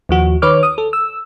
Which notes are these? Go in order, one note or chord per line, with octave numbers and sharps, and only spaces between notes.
D#2 F3 F#4
D#3 B4 C#5 D6 F6
D#6
A4
E6